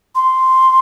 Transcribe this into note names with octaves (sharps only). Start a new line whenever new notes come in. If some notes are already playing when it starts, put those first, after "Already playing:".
C6